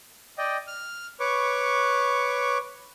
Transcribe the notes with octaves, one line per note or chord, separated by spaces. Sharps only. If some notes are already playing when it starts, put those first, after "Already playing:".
D5 D#5 G5
F6
B4 C#5 C#6 D6